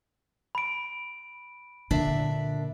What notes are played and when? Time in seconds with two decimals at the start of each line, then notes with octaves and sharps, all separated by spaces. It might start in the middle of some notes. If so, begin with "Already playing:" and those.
0.55 B5 D7
1.91 A#2 D3 D4 E5